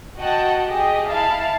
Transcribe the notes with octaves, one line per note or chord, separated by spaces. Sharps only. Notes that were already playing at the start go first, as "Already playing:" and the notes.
F#4 D#5 F#5 G5 A5
G4 G#4 D#5
E4 F5 A5